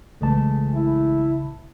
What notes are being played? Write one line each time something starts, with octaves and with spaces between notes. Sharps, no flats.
B1 C#3 E3 G#3 A3 A5
E4